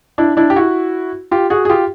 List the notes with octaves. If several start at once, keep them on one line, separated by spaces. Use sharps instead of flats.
D4 E4
D4 E4
G4
E4 F#4
F4 G4
F#4 G#4
G#4
F4 G4